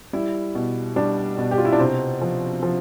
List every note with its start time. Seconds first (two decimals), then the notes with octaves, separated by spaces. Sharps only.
0.13 G3 E4
0.55 B2
0.96 G3 D4
1.38 B2
1.51 G4
1.58 F4
1.65 E4
1.72 D4
1.79 C3 C4
2.21 F3
2.63 F3